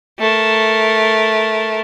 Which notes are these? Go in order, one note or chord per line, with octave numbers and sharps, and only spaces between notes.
A3 A#4